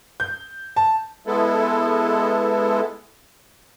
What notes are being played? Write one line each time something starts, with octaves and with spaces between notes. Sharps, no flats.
G6
A5
G#3 B3 E4 A4